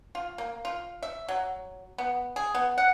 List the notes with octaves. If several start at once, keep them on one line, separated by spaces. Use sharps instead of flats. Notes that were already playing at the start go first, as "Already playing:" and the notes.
F4
A#3
F4
E5
F#3
B3
G#4
B3
F#5